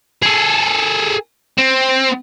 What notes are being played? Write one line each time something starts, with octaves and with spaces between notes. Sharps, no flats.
G#4 A4
C4